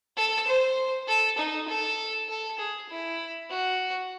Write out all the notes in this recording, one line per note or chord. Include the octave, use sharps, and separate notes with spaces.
A4
C5
A4
D#4
A4
A4
G#4
E4
F#4